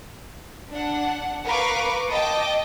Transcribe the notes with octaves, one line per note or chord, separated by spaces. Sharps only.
D4 F#5
A#4 B4 F5 C#6 D6
D#5 G5 A5 D6